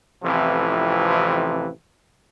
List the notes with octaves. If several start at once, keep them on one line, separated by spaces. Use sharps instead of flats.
A1 F2 C3 E3 F3